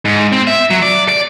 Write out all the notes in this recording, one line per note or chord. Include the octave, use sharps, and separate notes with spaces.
G#2
C4
E5
F#3
D5
D5